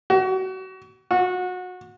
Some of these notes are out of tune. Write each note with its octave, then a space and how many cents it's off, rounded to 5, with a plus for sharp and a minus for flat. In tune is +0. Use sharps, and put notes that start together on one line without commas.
F#4 +30
F#4 -25